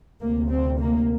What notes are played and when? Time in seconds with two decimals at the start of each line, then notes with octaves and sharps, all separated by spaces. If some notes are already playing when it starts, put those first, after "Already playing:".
0.20 D2 C3 A#3
0.49 C4
0.79 A#3